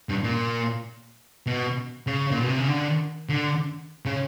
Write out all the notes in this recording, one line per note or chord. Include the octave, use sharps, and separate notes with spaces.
G2
A#2
B2
C#3
A#2
B2
C3
C#3
D3
D3
C#3